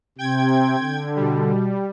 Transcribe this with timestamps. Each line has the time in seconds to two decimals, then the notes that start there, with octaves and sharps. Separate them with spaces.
0.18 C3 C4 G5 G#6
0.79 D3
1.16 B2 G3